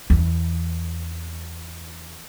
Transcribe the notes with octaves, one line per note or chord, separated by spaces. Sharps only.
E2 E3